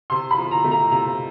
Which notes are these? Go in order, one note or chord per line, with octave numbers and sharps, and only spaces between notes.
C3 C6
B5
F3
A#5
A3
A#5
C3 A#5